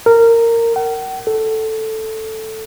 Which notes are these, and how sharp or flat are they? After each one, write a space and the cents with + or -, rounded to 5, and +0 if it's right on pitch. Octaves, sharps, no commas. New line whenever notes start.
A#4 -15
F#5 +45
A4 +0